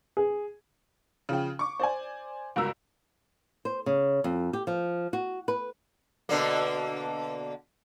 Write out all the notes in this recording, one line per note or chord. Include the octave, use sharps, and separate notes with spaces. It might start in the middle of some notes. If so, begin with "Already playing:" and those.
G#4
C#3 F3 G5
C#6 D6
C5 D5 G#5
G1 C#2 F#4 A#4 A#5 E6
C5
C#3
F2
G4
F3
F#4
B4
B2 D3 A#3